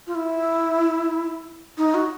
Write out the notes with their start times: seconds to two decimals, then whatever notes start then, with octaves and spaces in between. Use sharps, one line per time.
0.07 F4
0.15 E4
1.78 D#4
1.94 F#4